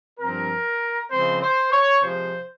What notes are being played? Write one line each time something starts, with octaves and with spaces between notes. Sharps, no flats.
G2 F3 C4 A#4
C#3 F3 G#3 C4 C5
C5
C#5
C3 F3 G#3 C5